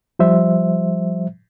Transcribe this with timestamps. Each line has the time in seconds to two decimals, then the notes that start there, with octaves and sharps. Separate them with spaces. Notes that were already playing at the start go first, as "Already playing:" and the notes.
0.19 F3 G3 C5 E5